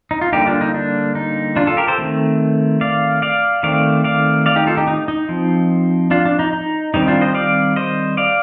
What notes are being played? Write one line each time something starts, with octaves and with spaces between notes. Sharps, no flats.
D#4
F4
D3 G3 A#3 D#4 G4
D4 F4
D#4
D4
D#4
D4 F4
F4 A4
G4 A#4
A4 C5
D#3 A3 C4
D5 F5
D5 F5
D#3 A3 C4 D5 F5
D5 F5
D5 F5
D#4 G4
F4 A4
D#4 G4
D#4
D#4
F3 C4
D4 F4
D4
D#4
D#4
D#3 G3 C4 D#4
D4 F4
C5 D#5
D5 F5
C5 D#5
D5 F5